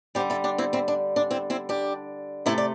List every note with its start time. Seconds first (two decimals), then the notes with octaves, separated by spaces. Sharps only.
0.15 D3 G3 G4 C5
0.30 E4 A4
0.44 D4 G4
0.58 C4 E4
0.73 C4 E4
0.88 D4
1.16 D4
1.31 C4 E4
1.50 C4 E4
1.69 D4 G4
2.46 C3 A3 E4 A4
2.58 D5